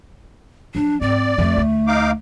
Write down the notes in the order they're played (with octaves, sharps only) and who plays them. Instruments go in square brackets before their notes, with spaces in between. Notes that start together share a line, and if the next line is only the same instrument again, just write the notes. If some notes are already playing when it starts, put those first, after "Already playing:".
[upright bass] F3 F#3 [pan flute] D4
[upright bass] G#2 [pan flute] C4 [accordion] D5
[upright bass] F2 C4 [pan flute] A3
[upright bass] D2
[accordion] D#4 F5 D6